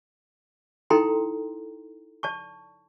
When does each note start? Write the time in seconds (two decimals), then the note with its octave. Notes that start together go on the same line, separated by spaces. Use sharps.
0.90 D#4 E4 A4 G5 A#5 C6
2.23 D5 A5 C#6